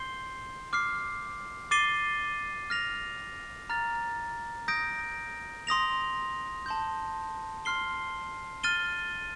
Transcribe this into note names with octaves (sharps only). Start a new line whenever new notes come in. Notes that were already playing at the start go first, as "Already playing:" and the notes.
Already playing: C6 G6 C7 G7
D6 F6 C7
D6 A6 C7 D#7 G7
F6 A#6 F7
A#5 F6 A6
D#6 G6 A#6 D7
C6 D#6 A#6 F7
A5 C6 G6
C6 F6 C7 G7
F6 A6 D#7 G7